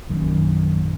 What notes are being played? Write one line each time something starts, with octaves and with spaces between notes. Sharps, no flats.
A#1 F#2 D#3